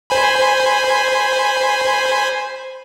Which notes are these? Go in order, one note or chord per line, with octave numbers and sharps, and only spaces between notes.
C5 G#5 B5